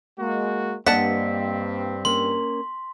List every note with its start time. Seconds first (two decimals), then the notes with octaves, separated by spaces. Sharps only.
0.18 G#3 A#3 F#4
0.87 G2 A#3 C4 D5 D#5 F#5 A5 B6
2.05 A#3 C#4 A#4 C6